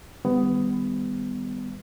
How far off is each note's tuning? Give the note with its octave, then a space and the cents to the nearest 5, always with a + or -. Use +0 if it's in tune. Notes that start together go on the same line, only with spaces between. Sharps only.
D#3 +0 G3 +25 B3 +20